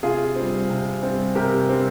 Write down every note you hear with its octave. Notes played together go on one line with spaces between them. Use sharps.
C3 F4 G#4
G3 C4
C3
G3 C4
C3 G4 A#4
G3 C4